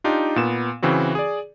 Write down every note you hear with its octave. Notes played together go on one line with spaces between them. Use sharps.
D4 D#4 F4 G4
A#2 B3 E7
C#3 E3 C4 F#4
G#4 D5